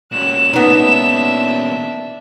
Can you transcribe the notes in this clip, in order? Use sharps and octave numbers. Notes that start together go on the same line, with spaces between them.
A#2 C#4 F#4 F#6 E7
B3 D4 D#4 E5